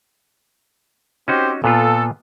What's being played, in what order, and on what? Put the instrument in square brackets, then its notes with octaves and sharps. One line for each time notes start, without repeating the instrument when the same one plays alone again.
[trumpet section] C4 G4 C5 [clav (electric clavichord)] C#4 D#4 F#4
[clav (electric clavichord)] A#2 B3 F4 [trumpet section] A4